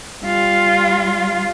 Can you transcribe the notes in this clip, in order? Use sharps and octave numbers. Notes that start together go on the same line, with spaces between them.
G3 F4